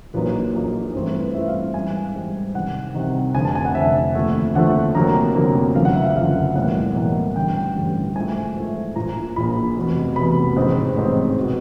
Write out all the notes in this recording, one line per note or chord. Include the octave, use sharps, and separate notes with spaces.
A#1 A#2 F#3 A#3 D#4 B4
A#1 A#2 F#3 A#3 D#4
G2 E3 A3 C4 F4 C5
B4
G2 E3 A3 C4 F4 E5
F5
G#2 E3 G3 G#5
G#2 E3 G3
C2 C3 D#3 F#5
C2 C3 D#3
F1 F2 D3 G#5
A5
G#5
F#5
F1 F2 D3 E5
D#2 D3 F3 A3
D#2 D3 F3 A3 F#5
F1 F2 D3 F#3 A#3 A#5
F1 F2 D3 F#3 A#3
F#1 F#2 D3 F3 F5
F#5
E5
F5
F#1 F#2 D3 F3 F5
B1 A2 E3 G3 A#3 F#5
B1 A2 E3 G3 A#3
A1 G2 D3 G3 G5
A1 G2 D3 G3
G#2 F3 A3 G#5
G#2 F3 A3
A#1 A#2 F3 A#5
A#1 A#2 F3 B5
F1 E2 B2
F1 E2 B2 B5
A1 G#2 D#3 G#3 C4
A1 G#2 D#3 G#3 C4
B2